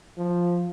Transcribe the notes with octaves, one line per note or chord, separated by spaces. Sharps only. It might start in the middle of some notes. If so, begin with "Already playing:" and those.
F3